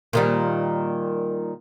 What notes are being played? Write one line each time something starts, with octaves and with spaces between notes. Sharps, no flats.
A#2 D#3 G3